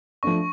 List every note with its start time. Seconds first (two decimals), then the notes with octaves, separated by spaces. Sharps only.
0.23 F3 A3 D4 C#6